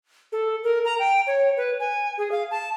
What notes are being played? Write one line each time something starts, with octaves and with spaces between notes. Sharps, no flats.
A4
A#4
A#5
G5
C#5
B4
G#5
G#4
F5
A5